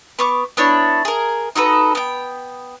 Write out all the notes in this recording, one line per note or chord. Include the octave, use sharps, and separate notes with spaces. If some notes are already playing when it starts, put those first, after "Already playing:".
B3 C#6 D6
B3 D4 E4 C#5
G#4 A#4
D#4 F#4 A4 B4
B3 G5